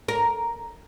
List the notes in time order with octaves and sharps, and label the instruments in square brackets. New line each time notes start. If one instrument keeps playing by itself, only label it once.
[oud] A#4